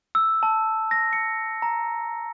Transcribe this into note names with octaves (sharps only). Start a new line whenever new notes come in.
E6
A5
A#6
C#7
A#5